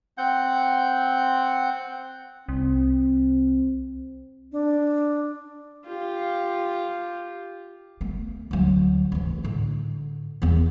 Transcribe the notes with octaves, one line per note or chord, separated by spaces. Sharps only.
C4 F#5 G6
C2 C4
D4
F4 G4
A3 B3
D2 F#3
D2 E3
A2 D3
E2 B3